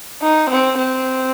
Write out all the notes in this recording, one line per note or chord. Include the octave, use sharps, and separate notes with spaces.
D#4
C4
C4